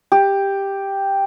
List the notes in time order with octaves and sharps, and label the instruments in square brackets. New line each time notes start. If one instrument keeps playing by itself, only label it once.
[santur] G4